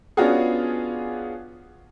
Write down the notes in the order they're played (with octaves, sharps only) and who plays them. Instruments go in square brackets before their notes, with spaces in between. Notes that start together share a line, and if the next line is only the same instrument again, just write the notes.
[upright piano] B3 C#4 D4 F4 F#4 G#4